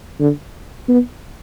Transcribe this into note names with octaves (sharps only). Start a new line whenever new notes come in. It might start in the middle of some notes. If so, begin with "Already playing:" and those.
D3
B3